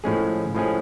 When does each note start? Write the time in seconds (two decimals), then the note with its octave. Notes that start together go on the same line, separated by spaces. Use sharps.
0.04 A2 F3 G#3 C#4 G#4
0.55 A2 F3 G#3 C#4 G#4